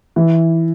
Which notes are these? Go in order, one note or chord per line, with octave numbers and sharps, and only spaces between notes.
E3